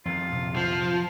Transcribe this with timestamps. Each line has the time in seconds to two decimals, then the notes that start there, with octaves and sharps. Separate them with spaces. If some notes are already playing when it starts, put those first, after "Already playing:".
0.05 F2 D#3 F4
0.30 A#1 C3
0.56 F3 C6